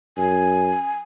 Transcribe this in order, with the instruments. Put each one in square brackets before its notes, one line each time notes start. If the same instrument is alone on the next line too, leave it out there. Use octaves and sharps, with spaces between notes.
[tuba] F#2 [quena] G#5